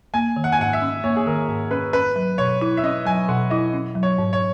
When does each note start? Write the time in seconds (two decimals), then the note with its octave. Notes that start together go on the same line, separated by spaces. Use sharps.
0.14 A#3 G#5
0.36 D#3
0.44 F#5
0.52 G#5
0.59 G#2 F#5
0.73 E5
0.82 C#4
1.04 A#3 C#5
1.16 G#4
1.27 D#3 A#4
1.49 G#2
1.71 C#4 B4
1.93 C#4 B4
2.16 F#3
2.38 B2 C#5
2.62 E4
2.77 E5
2.83 C#4 D#5
3.05 F#3 G#5
3.28 B2 F#5
3.50 E4 D#5
3.74 C#4
3.95 F#3
4.03 C#5
4.18 G#2
4.33 C#5